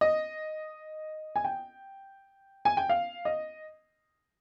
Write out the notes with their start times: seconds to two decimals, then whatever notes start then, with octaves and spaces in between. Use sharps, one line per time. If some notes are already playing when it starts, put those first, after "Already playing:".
0.01 D#5
1.36 G#5
1.44 G5
2.65 G#5
2.77 G5
2.90 F5
3.25 D#5